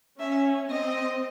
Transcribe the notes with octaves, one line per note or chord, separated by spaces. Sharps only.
C#4 E5
C4 D#5